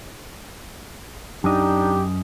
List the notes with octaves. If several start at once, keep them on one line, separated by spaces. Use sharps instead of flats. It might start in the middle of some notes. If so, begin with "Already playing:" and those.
F#2 D4 D#4 G4 D#5